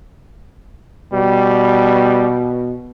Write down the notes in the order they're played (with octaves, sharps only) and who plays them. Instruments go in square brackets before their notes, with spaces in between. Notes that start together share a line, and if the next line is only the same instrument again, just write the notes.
[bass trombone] B2 [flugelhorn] G3